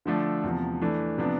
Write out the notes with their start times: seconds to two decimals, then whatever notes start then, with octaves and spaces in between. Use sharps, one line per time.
0.06 D3 F3 A3 D4 A4
0.43 E2 C3 F3
0.81 E3 A3 D4
1.18 C3 F3 B3 D4